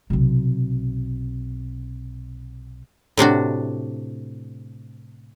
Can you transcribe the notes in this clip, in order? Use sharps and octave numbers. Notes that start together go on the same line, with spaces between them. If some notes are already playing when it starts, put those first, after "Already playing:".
B1 C3
A2 C3 D4 F#4